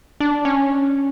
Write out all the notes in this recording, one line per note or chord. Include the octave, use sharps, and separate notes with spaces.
D4
C#4